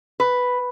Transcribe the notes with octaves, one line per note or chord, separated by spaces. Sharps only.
B4